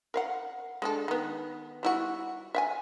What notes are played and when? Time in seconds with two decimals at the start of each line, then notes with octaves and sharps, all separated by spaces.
0.14 A#4 F5 F#5
0.82 G#3 D4 A4
1.08 D#3 B3
1.83 G3 E4 F#4
2.55 E5 F#5 G#5